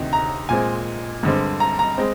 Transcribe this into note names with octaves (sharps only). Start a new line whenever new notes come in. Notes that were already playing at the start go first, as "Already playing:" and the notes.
Already playing: D2 C3 D#3
A#5
A#2 G#3 C4 G#5
G2 D3 G#3 C4
A#5
A#5
G#3 C4